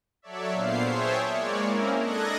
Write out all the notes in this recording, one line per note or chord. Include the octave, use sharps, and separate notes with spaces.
F#3 A4 C#5 D5 E5
A#2 B3 D4 C5 F5 C7
G#4 C5 C#5 E5 G5 A5
G#3 A#3 C#5 D5
A#3 C4 C#4 E4 A#4
D4 A4 D#5 F#6 G#6 A#6